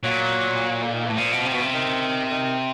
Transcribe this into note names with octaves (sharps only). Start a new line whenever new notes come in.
A#2 F#3
D3
D#3
A2 E3
A#2 F3
B2
C3
B2
C3
D#3
D#3